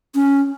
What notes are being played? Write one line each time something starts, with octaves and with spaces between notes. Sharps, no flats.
C#4